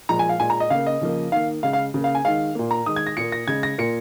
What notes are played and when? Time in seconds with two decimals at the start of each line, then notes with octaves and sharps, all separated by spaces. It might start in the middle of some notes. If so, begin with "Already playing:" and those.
0.09 A#2 F3 G#3 A#5
0.19 G#5
0.29 F5
0.40 A#2 G#3 G#5
0.50 A#5
0.60 D#5
0.70 C#3 A#3 F5
0.87 D#5
1.01 C#3 F3 A#3
1.32 D#3 A#3 F5
1.63 C#3 G#3 F5
1.73 F5
1.94 C#3 A#3
2.04 F5
2.15 G#5
2.25 D#3 G#3 F5
2.55 A#2 A#3
2.71 A#5
2.86 D#3 G#3 D#6
2.96 G#6
3.06 A#6
3.17 A#2 A#3 C#7
3.32 A#6
3.48 C#3 G#3 G#6
3.63 A#6
3.78 A#2 A#3 C#7